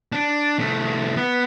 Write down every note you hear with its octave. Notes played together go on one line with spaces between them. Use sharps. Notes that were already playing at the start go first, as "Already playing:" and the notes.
D4
C2 A3
B3